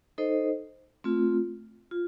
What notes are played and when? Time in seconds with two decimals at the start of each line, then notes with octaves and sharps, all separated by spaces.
0.18 D#4 A4 C5 D#5
1.04 A3 C4 F4
1.91 F4